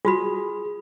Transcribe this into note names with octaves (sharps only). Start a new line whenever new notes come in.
F4 F#4 G#4 B5